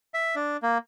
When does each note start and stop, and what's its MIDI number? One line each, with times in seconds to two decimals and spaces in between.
0.14 0.35 76
0.35 0.57 62
0.63 0.78 58